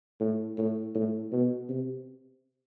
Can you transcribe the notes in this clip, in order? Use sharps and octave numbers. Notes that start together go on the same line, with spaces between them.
A2
A2
A2
B2
C3